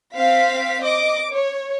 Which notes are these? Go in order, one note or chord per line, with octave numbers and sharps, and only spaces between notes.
C4 F5 B6
D#5 D6
C#5